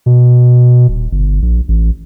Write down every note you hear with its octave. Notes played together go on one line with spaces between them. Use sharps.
B2
D#1
G1
A#1
A1